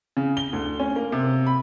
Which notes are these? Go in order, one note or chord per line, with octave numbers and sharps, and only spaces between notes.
C#3
G7
D2
C#4
A#3
C3
B5